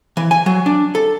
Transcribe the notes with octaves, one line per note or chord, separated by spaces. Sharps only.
E3
G#5
F#3
D4
A4